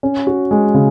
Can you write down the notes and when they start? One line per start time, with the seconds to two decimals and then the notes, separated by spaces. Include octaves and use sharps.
0.03 C#4
0.27 F#4
0.51 G#3
0.74 C#3